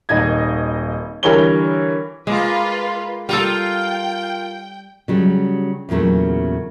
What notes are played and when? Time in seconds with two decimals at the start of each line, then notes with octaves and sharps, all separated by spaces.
0.09 D#1 G#1 D#3 D#5 G#6
1.23 D3 E3 G3 A#4 C#5 G7
2.27 G#3 A#3 F4 B4
3.29 G3 F4 A4 A#4 G5
5.08 C#3 F#3 G3
5.89 E2 A#2 C#3 F#3 A3